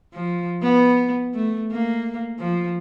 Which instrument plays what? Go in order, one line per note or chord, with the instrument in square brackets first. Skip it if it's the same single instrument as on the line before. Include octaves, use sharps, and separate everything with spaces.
[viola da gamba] F3
B3
A3
A#3
F3